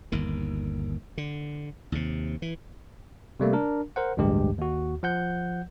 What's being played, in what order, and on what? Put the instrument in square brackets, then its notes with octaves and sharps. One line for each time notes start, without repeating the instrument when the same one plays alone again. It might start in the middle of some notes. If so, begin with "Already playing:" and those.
[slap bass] G1 D#2 D#3
D3
D#2 C3
E3
[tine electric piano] C3 G3 A3 A#3
D4 A#4
A#4 C5 F#5
A1 D2 G2 G#3 G4
D#2 F#4
F3 F#5 G6